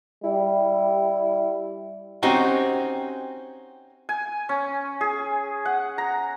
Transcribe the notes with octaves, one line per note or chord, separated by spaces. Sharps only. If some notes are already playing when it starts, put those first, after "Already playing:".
G3 E4
C4 C#4 D#4 F#4 G4
G#5
C#4
G#4
F#5
A#5